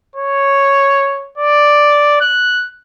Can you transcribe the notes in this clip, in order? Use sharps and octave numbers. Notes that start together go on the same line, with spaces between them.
C#5
D5
F#6